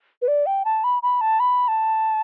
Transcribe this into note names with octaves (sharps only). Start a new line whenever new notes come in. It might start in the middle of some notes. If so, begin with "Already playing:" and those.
B4
D5
G5
A5
B5
B5
A5
B5
A5